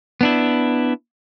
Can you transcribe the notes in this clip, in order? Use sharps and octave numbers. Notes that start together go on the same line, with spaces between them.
B3 D4 E4